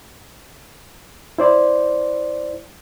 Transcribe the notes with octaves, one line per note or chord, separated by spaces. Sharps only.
E4 C5 D5